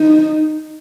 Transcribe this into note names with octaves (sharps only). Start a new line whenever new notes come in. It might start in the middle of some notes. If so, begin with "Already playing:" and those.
Already playing: D#4